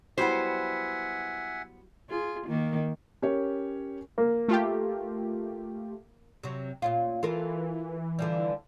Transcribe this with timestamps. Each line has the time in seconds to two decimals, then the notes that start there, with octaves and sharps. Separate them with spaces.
0.18 F#3 G3 B3 E4 C5 E5 F#5 G#5
2.10 F4 G#4
2.47 D#3 A#3
3.22 C#4 G4 A#4 C#5
4.18 A#3
4.48 A3 F4 G4
6.43 C3 F#3
6.82 A#2 C#4 F4
7.23 E3 F4 A4 A#4
8.19 D3 F3 G3